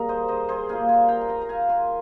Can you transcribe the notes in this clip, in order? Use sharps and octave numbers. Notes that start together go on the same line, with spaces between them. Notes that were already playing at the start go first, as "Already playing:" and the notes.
Already playing: D#3 G3 A#3 G#4 A#4
C5 D#5
C5 D#5
G#4 C5
A#2 G3 A#3 F5 G#5
G#5 C6
G5 A#5
G#5
G5 A#5
A#5
F5 G#5
G#5 C6